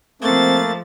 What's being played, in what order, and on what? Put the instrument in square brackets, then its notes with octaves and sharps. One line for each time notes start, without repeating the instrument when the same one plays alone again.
[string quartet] F3 A6 [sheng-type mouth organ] A3 A#3 [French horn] C4